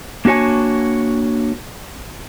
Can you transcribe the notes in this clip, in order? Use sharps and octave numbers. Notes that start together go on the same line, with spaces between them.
A#3 D4 F#4 C#5 G#5